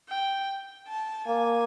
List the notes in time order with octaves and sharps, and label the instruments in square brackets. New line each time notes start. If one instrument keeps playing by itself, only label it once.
[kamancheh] G5
A5
[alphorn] A#3 [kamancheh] G#5